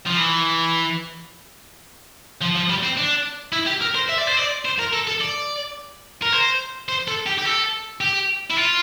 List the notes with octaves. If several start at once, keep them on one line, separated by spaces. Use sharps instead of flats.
F3
E3
F3
F3
G3
C4
D4
E4
G4
A#4
C5
E5
D5
C5
D5
C5
A#4
A4
A4
D5
A#4
C5
C5
A4
G4
G4
A4
G4
E4
F4